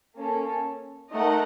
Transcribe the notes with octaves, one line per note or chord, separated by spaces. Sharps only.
A#3 C#4 A4
A3 D#4 A#4 D#5 F#5